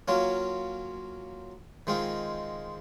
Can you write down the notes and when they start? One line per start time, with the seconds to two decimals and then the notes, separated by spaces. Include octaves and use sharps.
0.08 F#3 A#3 C#4 F4
1.87 D#3 G#3 C4 F4